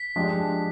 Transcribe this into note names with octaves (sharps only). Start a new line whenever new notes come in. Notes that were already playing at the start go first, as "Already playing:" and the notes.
Already playing: B6
F3 G#3 D4 G4